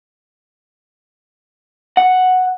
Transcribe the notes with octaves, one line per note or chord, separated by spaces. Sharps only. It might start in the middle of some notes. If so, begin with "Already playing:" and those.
F#5